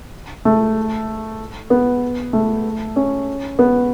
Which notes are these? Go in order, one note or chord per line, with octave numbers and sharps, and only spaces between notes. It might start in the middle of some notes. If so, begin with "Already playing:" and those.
A3
B3
A3
C#4
B3